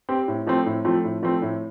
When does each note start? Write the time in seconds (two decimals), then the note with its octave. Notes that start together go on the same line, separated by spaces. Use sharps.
0.09 C4 G4
0.28 A2
0.47 F3 A3 C4
0.66 A2
0.85 F3 A3 C4
1.04 A2
1.22 F3 A3 C4
1.42 A2